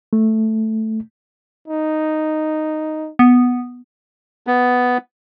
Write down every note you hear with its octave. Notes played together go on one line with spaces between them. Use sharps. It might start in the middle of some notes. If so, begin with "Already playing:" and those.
A3
D#4
B3
B3